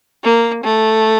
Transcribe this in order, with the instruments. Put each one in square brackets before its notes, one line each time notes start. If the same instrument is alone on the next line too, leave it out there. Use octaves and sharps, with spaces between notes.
[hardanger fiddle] A#3
A3